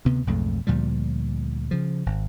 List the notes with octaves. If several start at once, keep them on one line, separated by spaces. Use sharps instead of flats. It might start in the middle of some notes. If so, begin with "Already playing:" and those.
D2 C3 B3
B1 F2 G#2 A3
D2 A#2 F3 G3
C#3 F3
G#1